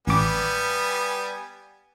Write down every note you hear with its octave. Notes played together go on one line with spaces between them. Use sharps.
A1 G3 B3 G#5 D6